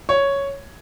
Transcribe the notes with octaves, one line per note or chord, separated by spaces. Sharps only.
C#5